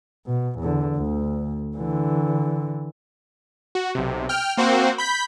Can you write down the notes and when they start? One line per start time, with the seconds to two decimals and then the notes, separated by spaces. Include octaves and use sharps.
0.27 B2
0.59 E2 D3
0.96 D2
1.76 D3 E3
3.75 F#4
3.95 B1 C3
4.29 G5 F6
4.57 A#3 C4 F#4 C5
4.98 B5 G6 B6